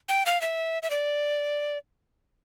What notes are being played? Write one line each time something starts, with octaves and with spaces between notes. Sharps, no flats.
G5
F5
E5
E5
D5